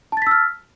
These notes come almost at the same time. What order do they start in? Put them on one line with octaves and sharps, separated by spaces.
A5 A6 B6 E6 F6